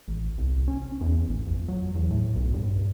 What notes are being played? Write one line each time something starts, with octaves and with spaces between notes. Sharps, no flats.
A1
C2
C#4
E2
A1
F2
F#3
E2
A2
B1
G2